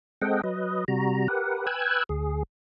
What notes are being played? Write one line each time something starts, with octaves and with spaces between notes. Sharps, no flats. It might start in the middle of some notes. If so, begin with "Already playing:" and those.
G#3 C4 A4 D#5 F#5 G5
F#3 B4 D#5
C3 G3 F#4 A#5
G4 A#4 B4 F#5
B4 G5 G#5 E6 F#6 G#6
D2 G#4